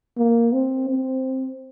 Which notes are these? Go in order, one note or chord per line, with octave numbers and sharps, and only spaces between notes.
A#3
C4
C4